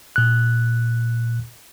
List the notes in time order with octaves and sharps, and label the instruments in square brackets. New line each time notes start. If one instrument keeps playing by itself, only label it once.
[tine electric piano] A#2 F#6